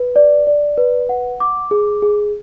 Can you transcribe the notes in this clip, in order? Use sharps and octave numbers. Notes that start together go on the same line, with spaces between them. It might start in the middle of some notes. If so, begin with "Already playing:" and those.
Already playing: B4
D5
D5
B4
F#5
D6
G#4
G#4